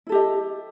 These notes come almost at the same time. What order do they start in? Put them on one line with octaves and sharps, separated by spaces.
E4 A4 G4 D#5